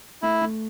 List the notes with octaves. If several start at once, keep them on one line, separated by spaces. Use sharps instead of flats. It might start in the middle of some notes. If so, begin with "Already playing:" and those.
A3 E4
A3